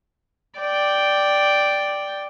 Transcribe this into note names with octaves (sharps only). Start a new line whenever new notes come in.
D5 G5